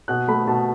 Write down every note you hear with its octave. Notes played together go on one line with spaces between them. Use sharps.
B2 F#6
A3 B5
B2 A5